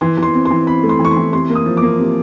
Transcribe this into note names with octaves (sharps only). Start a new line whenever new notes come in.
E3 C6
E3 C6
C4
C6
E3
C4 B5
A3
C6
E3
C#6
C6
E3
C3 C6
A#3
D#6
F3
D6
A#3
C3